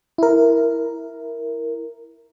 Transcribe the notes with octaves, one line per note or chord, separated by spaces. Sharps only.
E4 A#4